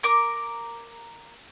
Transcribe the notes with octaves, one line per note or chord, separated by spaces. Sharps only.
A#4 D6